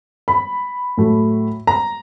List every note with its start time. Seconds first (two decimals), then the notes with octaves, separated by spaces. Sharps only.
0.28 B5
0.97 A2 F#3 A3
1.67 A#5